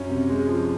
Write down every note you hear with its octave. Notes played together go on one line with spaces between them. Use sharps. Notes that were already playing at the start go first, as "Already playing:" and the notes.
Already playing: F#2 C#4
C3
G#3
F3